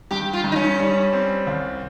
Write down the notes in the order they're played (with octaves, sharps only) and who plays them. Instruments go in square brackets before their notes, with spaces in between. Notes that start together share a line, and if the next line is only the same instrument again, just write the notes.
[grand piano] G2 [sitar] G4
[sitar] F4
[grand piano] G2
[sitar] D#4
C#4
[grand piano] G3
C4
C2